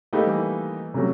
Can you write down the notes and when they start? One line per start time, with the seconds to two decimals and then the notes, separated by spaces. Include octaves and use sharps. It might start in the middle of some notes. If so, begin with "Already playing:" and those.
0.13 G3 A3 A#3 D#4 G4 B4
0.27 E3
0.94 C3 F#3 A3 C#4